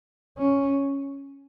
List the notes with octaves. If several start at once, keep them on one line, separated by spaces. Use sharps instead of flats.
C#4